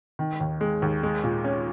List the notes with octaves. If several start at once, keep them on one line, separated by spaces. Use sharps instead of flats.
D#3
D#2
G#3
D#2
G#3
A#2
C#4